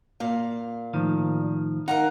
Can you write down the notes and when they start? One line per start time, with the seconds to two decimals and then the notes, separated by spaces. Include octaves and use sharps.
0.20 A#2 F5
0.94 A2 D#3 F3
1.88 D#4 A#4 F5 F#5